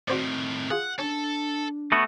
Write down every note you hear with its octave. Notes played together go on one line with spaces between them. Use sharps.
A2 D#3 C4 F#4 C5 D5
F4 G#4 F#5
C#4 D4 A4
A3 B3 F#4